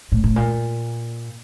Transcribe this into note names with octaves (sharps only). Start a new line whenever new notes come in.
A2
A2
A#2